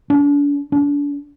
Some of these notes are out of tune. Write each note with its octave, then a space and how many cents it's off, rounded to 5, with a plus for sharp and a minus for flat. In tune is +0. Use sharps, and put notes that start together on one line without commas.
D4 -40
D4 -35